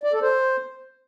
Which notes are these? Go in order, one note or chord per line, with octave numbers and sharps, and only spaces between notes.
D5
A4
C5